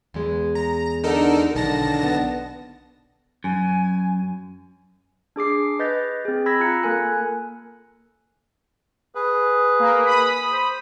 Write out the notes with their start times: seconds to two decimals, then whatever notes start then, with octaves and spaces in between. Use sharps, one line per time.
0.14 E2 G#3
0.55 A#5
1.04 D3 D#4 A4 A#4
1.55 B1 D3 D#3 A5 A#6
2.03 B3
3.44 F#2 G#5
5.36 D4 G#4 D6 C7
5.79 B4 D#5 G6 A6 B6
6.25 C4 G#4
6.46 B5 E6 G#6 A#6 B6
6.60 F4 A#5 F#6 C#7
6.83 A#3 A4 A#4 G#5 F#6
9.15 G#4 B4
9.79 A#3
10.04 B5 D#6
10.52 C5